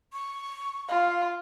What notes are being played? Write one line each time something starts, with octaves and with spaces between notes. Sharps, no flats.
C#6
F4 F5